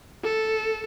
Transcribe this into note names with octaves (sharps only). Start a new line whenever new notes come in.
A4